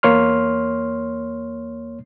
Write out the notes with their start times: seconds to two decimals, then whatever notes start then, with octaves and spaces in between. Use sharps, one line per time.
0.03 E2 A#3 C#5 C6 F6